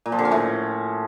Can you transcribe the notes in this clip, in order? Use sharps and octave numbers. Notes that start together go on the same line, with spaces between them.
A#2
F3
D3
C#4
A2